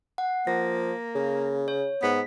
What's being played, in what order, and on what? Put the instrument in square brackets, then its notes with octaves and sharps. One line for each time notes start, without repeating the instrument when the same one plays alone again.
[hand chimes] F#5
[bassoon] F3 [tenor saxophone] A#3 [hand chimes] A#6
[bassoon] C#3
[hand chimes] C#5
[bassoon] G#2 [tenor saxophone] B3 [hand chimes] B6